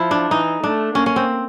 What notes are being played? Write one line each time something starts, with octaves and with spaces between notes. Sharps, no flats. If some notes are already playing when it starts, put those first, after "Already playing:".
Already playing: F3 E4
D4
E3 D#4
A3 D4
A#3 C#4
C#4
C4